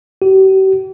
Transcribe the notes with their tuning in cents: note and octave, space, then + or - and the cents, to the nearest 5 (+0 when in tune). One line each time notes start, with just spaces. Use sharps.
G4 -40